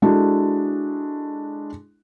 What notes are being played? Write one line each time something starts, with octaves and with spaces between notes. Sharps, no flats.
G#3 D4 E4 F#4 A4